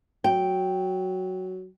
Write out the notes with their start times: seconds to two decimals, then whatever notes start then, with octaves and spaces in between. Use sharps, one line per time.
0.24 F#3 G5